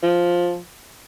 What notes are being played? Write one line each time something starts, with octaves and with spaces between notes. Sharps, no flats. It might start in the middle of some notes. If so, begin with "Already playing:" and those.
F3